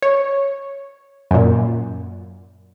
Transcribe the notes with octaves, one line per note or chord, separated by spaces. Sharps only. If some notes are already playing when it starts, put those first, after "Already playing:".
C#5
F#2 A#2